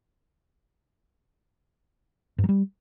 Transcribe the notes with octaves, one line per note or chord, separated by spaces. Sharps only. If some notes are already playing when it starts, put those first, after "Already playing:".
G2
F#3
G3